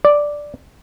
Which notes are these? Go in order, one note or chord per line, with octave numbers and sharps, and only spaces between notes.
D5